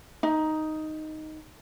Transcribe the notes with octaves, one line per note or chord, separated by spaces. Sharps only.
D#4